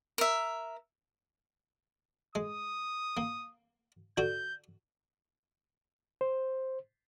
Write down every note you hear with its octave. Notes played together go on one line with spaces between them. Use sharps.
A#4 E5
G#3 D#6
A#3
D3 F#4 G6
C5